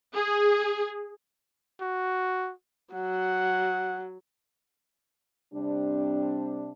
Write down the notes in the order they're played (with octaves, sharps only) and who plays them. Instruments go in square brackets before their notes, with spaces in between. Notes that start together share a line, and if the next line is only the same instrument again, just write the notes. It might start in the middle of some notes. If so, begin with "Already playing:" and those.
[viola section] G#4
[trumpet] F#4
[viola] F#3 [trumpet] F#5
[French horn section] C3 G3 C4 D4